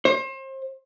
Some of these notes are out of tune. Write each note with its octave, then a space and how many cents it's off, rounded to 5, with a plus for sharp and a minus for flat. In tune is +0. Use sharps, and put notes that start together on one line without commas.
C5 +35